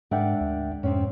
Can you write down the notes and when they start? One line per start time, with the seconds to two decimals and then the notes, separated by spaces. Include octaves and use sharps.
0.11 G#2 G#3 D4 A#4 E5 F#5 G5
0.41 D2
0.83 F2 G#2 C3 C4 C#4